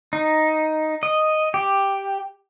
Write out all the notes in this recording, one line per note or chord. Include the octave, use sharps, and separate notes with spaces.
D#4
D#5
G4